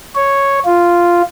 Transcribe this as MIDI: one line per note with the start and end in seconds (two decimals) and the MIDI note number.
0.15 0.59 73
0.66 1.22 65